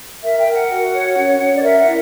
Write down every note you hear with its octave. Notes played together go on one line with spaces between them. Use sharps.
A#4 E5
G5
A#4
F#5
F#4
C#5
C#4
C#4
D5
A#4 E5
F#5
E4